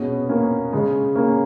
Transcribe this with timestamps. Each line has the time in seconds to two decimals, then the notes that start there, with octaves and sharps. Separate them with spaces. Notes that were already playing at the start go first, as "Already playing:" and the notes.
Already playing: B2 G#3 B3 C#4
0.29 A#3 C#4
0.72 C#3 G#3
1.15 A#3 C#4